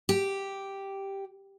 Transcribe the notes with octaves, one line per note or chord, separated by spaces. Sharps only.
G4